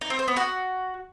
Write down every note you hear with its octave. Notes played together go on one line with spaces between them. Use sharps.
D#4
C4
C5
B3
F#4